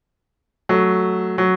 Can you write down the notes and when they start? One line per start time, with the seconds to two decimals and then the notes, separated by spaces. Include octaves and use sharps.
0.69 F#3 A3
1.38 F#3